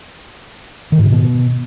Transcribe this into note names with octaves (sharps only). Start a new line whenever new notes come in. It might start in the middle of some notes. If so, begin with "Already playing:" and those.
D#3
G#2
C#3
B2